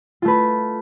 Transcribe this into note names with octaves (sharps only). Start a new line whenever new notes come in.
A3 F4 B4